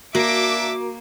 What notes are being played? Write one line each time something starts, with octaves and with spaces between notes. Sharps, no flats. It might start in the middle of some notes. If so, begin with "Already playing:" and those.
A#3 D4 F#4 E5 D6